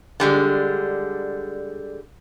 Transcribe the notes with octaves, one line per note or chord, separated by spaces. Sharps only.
D3 G3 G#3